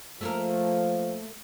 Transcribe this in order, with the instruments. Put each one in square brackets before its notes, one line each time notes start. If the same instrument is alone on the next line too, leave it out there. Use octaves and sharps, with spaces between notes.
[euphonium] F3 [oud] A3 A#3 A#4